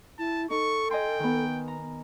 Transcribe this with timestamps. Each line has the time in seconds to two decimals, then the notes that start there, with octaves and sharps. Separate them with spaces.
0.19 E4 A5
0.50 D#4 A4 C#6
0.91 D#5 G5 G#5 C6
1.19 D#3 B3
1.68 A#5